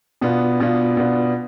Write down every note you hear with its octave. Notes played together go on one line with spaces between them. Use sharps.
B2 B3 D4 F4
B2 B3 D4 F4
B2 B3 D4 F4